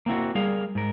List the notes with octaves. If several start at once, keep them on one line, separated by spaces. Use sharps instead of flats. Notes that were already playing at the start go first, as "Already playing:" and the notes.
A#3 C4 E4 F#4
G3 G#4 A#4 F5
G#2 A#4